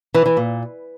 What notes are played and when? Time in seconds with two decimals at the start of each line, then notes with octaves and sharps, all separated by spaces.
0.14 E3
0.26 E3
0.37 A#2